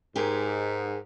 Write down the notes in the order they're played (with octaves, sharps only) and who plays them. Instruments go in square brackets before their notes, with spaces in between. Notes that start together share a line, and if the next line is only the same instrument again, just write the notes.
[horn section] G#2 [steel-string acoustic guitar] G4 G#4 A#4